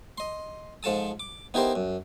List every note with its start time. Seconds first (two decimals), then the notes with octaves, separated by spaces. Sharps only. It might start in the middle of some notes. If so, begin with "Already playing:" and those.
0.18 D#5 C6
0.83 G#2 F3 A4 A5 D#6
1.20 D6
1.54 B3 D#4 E4 G4 A#4 C5
1.75 F#2